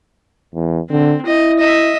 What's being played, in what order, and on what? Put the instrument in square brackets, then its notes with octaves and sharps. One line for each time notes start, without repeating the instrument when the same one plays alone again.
[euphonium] E2
[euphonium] D3 [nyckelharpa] C4
[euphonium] E4 [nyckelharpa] D#5
[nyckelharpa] D#5 E5